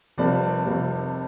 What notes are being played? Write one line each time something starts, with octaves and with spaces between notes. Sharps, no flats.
F1 F2 C3 G3 A#3 D5
F1 F2 C3 G3 A#3